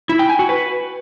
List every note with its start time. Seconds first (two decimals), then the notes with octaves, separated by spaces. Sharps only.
0.09 E4
0.19 G5
0.29 G#5
0.39 F#4
0.49 B4